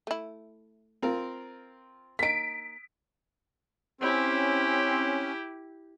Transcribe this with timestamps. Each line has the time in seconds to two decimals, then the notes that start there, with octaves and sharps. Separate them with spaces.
0.07 A3 E4
1.02 C4 F4 A#4
2.19 A#3 D#4 B6 D7
4.01 C4 C#4 E4 G4